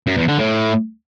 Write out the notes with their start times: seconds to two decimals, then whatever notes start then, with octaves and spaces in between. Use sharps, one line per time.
0.07 F#2
0.17 E2
0.28 D3
0.39 A2